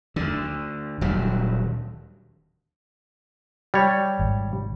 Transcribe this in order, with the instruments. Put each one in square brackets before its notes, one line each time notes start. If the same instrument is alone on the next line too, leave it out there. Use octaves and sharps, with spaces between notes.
[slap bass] D2 D3
D#1 D2 F#3 G3
[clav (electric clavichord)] G3 C#5
[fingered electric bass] G#1